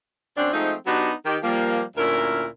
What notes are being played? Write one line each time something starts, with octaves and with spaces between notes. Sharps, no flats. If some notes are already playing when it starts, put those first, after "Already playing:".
F#2 C4 D4
F3 G#3 A3 C4 D#4
F#3 B3 D4 D#4 F#4 G4
D#3 G4
F3 G3 A#3
D2 A#2 C#4 E4 A#4